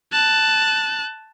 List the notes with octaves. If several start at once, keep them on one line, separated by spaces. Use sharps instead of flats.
A5 F#6